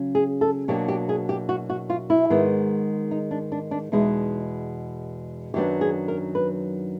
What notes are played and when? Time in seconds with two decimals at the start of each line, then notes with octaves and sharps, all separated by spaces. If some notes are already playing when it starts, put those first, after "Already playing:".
Already playing: C#3 F#3 C#4
0.15 G#4
0.41 A4
0.68 B2 F#3 A#3 D4 G4
0.88 G4
1.09 G#4
1.29 G4
1.49 F#4
1.70 F#4
1.90 F4
2.10 E4
2.30 G#2 D#3 G#3 B3
3.11 D#4
3.31 D4
3.52 D4
3.71 D4
3.92 E2 B2 G#3 D#4
5.54 F#2 D#3 F#3 B3 D4 G4
5.81 G#4
6.08 A#4
6.35 B4